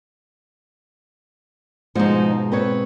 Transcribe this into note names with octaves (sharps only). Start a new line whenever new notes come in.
G#2 B2 F3 G#3 D#4
C4 B4 C#5